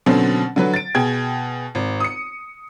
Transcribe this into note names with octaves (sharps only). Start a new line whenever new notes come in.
B2 D3 F#3 C4 C#4
D3 F#3 B4
A6 D7
B2 G#4 G5 G#6
G#1
D#6 C#7